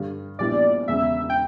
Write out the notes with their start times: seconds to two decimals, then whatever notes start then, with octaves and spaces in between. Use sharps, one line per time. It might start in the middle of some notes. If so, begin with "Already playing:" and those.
Already playing: G2 D3 G3
0.39 A#1 A#2 G3 B3 E4 D5
0.88 E1 E2 C#3 E5
1.30 G5